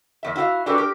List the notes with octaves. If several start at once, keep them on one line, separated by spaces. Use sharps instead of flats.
E2 E5
E4 F#4 D5 F5
D4 F#4 G4 A4 B4
G4 A#4